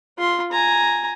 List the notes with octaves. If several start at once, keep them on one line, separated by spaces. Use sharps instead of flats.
F4 C6
G#5 A#5